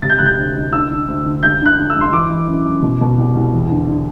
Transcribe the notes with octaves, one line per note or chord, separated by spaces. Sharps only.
C3 A6
G6
C3 F#6
G6
D2
D2
D3 E6
D3
D2
D3
G2 G6
D3 F#6
D3
E6
G2
C6
E3 D6
E3
F#2
F#2
B2
B2
C2
C2
E2
D3
D3